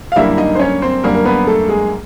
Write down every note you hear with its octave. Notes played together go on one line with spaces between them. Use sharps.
F5
F#2 D3 G3 A#3 E4 E5
D#4 D#5
C5
C#4 C#5
C4 C5
F#2 D3 G3 A#3 A#4
A#4
B3 B4
A3 A4
G#3 G#4